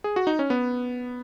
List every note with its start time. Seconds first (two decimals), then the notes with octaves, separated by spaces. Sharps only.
0.04 G#4
0.16 F#4
0.27 D#4
0.39 C#4
0.50 B3